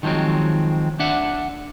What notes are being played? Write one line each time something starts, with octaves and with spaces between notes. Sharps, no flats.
D#3 F3 F#3 G#3 C4
D4 E5 F#5